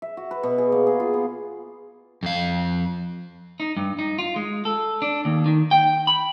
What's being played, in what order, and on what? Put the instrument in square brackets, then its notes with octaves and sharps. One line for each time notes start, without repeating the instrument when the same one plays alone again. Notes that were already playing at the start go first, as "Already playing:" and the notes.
[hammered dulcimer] E5
F#4
B4
B2
G#4
A#3
G#4
F4
B3
[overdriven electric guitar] F2 F5
[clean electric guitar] D#4
G2
D#4
F4
G#3
A4
D4
D#2
D#3
G5
B5